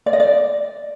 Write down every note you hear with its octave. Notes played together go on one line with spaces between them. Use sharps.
D5
D#5
D5